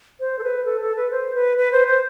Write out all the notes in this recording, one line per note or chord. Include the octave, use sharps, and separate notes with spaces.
C5
A4
B4
A4
A4
B4
C5
B4
B4
C5
C5